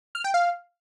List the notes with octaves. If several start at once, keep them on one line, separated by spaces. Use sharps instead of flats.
F6
G5
F5